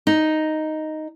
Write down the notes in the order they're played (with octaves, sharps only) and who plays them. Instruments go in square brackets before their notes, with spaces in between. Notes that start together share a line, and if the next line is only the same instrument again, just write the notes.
[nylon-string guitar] D#4